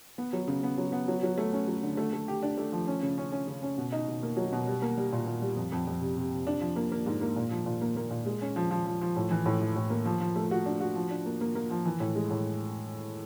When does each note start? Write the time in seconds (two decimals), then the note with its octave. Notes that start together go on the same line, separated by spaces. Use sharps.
0.18 B3
0.33 F#3
0.48 C#3
0.63 B3
0.78 F#3
0.92 B3
1.08 F#3
1.23 F#3
1.38 A3
1.53 C#4
1.68 F#3
1.83 D3
1.97 A3
2.13 A3
2.28 G4
2.43 D4
2.58 A3
2.72 F3
2.87 C#4
3.02 C#3
3.18 C#4
3.32 C#4
3.47 C#3
3.63 C#4
3.78 B2
3.92 D#4
4.08 B2
4.23 A#3
4.37 F#3
4.52 B2
4.67 G3
4.82 A#3
4.97 G3
5.12 A#2
5.27 A#2
5.42 G3
5.56 F2
5.72 F2
5.87 F2
6.01 C3
6.17 C3
6.32 C3
6.47 D4
6.61 F3
6.76 A#3
6.92 A#3
7.06 G#2
7.21 A#3
7.36 A#2
7.51 F3
7.66 A#2
7.82 A#3
7.96 A#3
8.11 A#2
8.26 G#3
8.42 C#4
8.56 F3
8.71 F3
8.87 F3
9.02 F3
9.16 A2
9.31 E3
9.46 A2
9.61 E3
9.76 A2
9.90 A#3
10.06 F3
10.21 F3
10.36 A3
10.51 F#4
10.66 D4
10.81 F#4
10.95 F3
11.10 D4
11.26 A#3
11.41 A#3
11.55 A#3
11.71 F3
11.85 E3
12.00 A2
12.16 G#3
12.30 A2